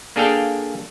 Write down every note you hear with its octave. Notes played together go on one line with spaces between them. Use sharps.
A#3 D4 G#4 A4 F5 G5